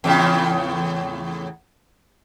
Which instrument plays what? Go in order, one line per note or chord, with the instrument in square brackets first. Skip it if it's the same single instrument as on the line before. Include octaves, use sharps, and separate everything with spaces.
[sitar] E2 A2 C#3